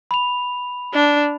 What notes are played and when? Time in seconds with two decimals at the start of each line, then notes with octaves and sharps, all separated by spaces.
0.11 B5 F7
0.94 D4